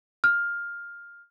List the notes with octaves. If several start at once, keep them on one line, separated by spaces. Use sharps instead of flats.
F6